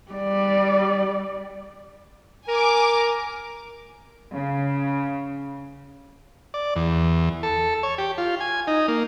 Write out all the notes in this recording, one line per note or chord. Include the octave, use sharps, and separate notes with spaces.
G3 D5
A#4 G#5 D6
C#3
D5
E2
A4
C#5
G4
F4
G#5
D#4
A#3